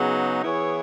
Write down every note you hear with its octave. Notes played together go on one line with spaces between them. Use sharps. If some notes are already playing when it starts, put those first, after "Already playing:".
Already playing: C#3 F#3 B3 D#4 G#4
E3 B3 E4 G#4 C#5